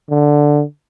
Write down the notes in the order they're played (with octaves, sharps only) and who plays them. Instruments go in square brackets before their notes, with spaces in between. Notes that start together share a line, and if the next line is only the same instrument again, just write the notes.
[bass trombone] D3